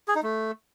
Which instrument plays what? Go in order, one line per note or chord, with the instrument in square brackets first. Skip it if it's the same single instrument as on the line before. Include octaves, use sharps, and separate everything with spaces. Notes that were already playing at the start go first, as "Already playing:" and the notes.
[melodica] G#4
D#4
A3